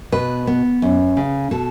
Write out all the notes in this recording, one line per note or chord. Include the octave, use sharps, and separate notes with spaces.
B2 B4
B3
F#2
C#3
B2 A4